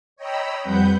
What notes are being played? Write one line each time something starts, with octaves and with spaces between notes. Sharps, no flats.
C#5 D#5 G5 A#5 B5 E6
F2 G3 C4 B4 F#5 G6